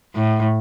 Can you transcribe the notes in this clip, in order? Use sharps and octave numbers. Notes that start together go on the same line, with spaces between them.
A2